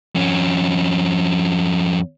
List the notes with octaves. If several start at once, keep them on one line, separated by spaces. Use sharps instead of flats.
F2 C#4